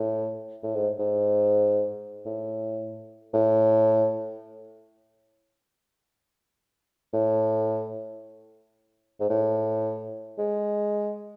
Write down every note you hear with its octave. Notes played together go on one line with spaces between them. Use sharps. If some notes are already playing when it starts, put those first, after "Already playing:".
Already playing: A2
A2
G#2
G#2
A2
A2
A2
G#2
A2
G#3